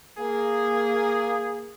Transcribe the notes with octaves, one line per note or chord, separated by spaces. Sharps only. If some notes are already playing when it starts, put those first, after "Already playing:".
A#3 G#4